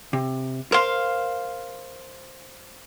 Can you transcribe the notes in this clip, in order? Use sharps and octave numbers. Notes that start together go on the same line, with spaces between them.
C3
A#4 C5 F5 C6